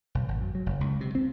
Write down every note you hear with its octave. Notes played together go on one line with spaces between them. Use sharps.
B1
G#1
F#2
F#3
F#1
C#2
C3
C4